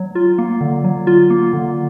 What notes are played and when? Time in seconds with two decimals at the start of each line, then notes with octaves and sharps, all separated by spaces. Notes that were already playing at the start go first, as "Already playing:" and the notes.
Already playing: F#3
0.15 F4
0.38 A#3
0.61 D3
0.84 F#3
1.07 F4
1.30 A#3
1.53 D3